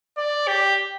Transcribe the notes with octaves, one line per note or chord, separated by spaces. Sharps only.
D5
G4